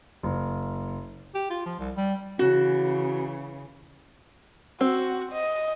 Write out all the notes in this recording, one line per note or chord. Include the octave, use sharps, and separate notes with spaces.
F#1
G4
F4
F3
C2
G3
C#3 E3 F#4
C4 F#4
D#5